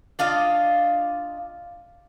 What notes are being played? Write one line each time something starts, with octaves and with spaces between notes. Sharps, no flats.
D4 F4 D#5 F5